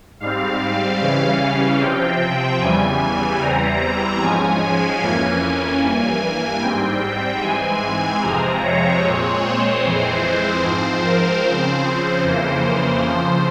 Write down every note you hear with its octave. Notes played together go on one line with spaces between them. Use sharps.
G#2 G3 C4 F5
C#3 E3 G3 C#4
C3 F3 C4 G5
E2 C#3 E3 G3 G#5
E2 E3 G3 C4 A#5
G#2 F3 G#3 C#4 G#5
F2 E3 A#3 C#4
G2 E3 A#3 G#5
G#2 G3 C4 G5
G#2 E3 G#3 C4 G#5
F2 C3 F3 G#3 C4 A#5
C#5
A#2 G#3 C4
C5
F2 E3 G#3 C4
C5
G#2 F3 C4 C5
A#4
C#3 F3 C4 C5
F2 C#3 E3 A#3 C5
C5
F2 C#3 F3